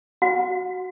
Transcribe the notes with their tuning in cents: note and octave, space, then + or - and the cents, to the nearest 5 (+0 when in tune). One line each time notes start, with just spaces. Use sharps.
F#4 +0 F#5 -35